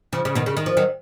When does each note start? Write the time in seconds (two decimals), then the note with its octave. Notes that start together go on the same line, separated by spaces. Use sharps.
0.13 C#3 F3
0.25 C#3
0.35 B2 D#3
0.46 C#3
0.57 D#3
0.66 F3
0.77 D#3 F#3